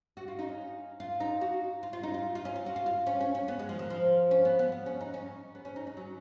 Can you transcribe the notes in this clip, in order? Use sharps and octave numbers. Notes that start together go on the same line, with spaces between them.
F#4
F4
D#4
C#4
F4
D#4
F#4
F4
F4
D#4
F4
F4
C#4
F4
F#4
F4
F4
C#4
C#4
C#4
B3
G#3
F3
D#3
F3
C#4
B3
B3
B3
C#4
D#4
C#4
B3
C#4
D#4
C#4
F#3